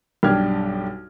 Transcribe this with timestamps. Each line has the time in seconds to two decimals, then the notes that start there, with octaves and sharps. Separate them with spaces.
0.23 B1 G2 D4 G4 F6 G#6